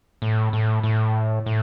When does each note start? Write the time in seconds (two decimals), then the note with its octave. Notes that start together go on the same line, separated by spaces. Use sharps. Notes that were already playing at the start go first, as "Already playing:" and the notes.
0.22 A2
0.53 A2
0.83 A2
1.46 A2